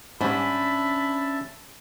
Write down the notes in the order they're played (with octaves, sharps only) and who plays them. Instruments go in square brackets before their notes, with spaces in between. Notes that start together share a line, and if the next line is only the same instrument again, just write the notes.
[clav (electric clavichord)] G#2 G3 [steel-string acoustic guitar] C#4 D4 C5 [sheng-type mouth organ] E5 A5 [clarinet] B5